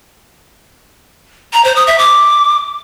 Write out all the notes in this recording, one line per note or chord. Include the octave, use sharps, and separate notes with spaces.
A#5
C5
D#6
E5
D6